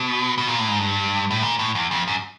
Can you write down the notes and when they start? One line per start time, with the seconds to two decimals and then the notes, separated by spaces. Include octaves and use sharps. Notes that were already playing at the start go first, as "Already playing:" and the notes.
Already playing: B2
0.38 B2
0.48 A#2
0.59 A2
0.68 G#2
0.79 G2
1.30 A2
1.43 A#2
1.59 A2
1.75 E2
1.91 F2
2.08 F#2